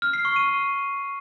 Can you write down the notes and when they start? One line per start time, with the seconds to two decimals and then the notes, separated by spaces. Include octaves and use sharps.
0.02 F6
0.13 C7
0.25 C#6
0.36 D#7